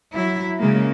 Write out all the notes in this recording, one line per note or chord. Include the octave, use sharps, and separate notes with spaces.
F#3 E4
C#3 G#3 A#3